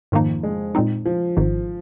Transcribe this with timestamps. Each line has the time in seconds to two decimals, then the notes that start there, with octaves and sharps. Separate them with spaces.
0.12 F2 G#2 D#3 A#3 D#4
0.43 G#3
0.75 A#2 G#3 C4 D#4
1.06 F3
1.37 G#1 G#2 D#3